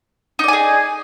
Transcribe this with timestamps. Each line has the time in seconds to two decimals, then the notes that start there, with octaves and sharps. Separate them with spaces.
0.39 D#4
0.44 D5
0.48 G#5
0.53 G#4